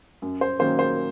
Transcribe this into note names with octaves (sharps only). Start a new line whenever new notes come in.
F#2
C5
D#3 F#3 A#3 C#4 C5
C5